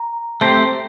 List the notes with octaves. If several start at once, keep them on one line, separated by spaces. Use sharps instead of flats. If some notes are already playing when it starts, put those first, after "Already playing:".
Already playing: A#5
A3 C4 G4 C5 A5